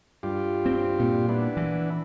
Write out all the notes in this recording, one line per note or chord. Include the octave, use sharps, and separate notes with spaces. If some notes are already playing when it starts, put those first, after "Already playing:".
G2 F4 G4
C4
A#2
B3 D4 E4
E3